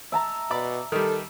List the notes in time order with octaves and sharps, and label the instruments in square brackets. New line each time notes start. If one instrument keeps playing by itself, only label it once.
[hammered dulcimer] E5 A5 A#5
[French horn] B2 [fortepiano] D5 B5 D6
[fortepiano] D#3 G3 [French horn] A4